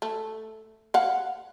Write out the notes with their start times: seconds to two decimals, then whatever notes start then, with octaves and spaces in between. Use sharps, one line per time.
0.02 A3
0.94 F5 F#5